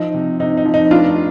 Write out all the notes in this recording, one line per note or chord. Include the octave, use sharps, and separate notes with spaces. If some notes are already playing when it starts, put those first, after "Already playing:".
Already playing: F3 D#4
C3
C3 D#4
D#4
F3
D#4
F1 D4 F4